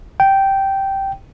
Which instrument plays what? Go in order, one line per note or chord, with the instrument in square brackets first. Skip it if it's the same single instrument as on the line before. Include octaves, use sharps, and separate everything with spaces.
[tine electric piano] G5